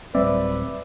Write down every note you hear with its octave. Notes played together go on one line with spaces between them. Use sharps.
D1 G3 C4 B4 D5 E5